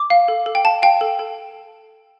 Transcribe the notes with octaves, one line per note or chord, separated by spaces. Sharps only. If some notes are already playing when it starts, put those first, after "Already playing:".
Already playing: D6
F5
A4
A4
G5
F5 A5
F5 G5
A4
A4